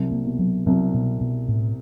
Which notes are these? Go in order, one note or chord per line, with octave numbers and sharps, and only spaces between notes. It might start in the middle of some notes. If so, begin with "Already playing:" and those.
Already playing: C2 C3 F#3
A#3
B2
F#3
C2 C3 F#3
B2
B2
A2